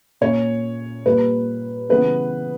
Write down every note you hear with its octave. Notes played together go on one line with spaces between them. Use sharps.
A#2 A#3 C#4 C#5
A#2 G3 A#3 B4
C#3 E3 G3 B3 B4